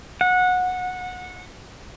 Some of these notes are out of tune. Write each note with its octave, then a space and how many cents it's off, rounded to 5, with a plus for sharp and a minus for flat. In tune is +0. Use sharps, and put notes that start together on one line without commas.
F#5 -20